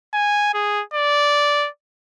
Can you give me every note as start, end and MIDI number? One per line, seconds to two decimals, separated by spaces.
0.14 0.49 80
0.54 0.82 68
0.94 1.68 74